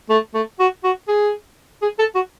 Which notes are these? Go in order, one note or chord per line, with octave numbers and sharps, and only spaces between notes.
A3
A3
F#4
F#4
G#4
G#4
A4
F#4